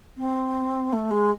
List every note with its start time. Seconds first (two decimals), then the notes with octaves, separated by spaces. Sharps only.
0.17 C4
0.92 A3
1.10 G#3